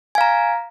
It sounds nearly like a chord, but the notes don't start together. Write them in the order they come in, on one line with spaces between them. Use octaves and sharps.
G#5 F5 A#5